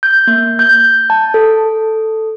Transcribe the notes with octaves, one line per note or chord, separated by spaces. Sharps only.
G6
A#3
G6
A5
A4